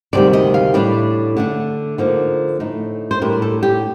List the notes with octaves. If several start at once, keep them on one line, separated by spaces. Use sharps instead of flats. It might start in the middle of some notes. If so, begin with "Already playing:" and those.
D2 C3 D#3 G3 D5
D#5
F5
A2 G3 D4 D5
D3 A3 D4
D3 F3 A#3 D#4
A2 A3 D#4
C5
A2 G3 D4 A#4
A4
G4